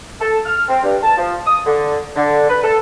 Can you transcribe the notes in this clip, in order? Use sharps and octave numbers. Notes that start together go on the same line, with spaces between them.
A4
F6
C4
G2
A5
F3
D#6
D3
D3
B4
A4